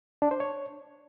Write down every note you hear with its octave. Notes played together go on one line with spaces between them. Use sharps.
D4
C5
C#5